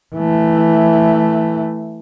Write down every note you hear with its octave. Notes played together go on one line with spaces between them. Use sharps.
E3 A3